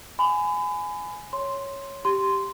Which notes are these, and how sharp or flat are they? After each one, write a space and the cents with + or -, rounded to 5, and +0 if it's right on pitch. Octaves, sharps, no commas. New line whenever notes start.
G#5 +5 B5 +35
C#5 +0 C6 +0
G4 -5 C6 -10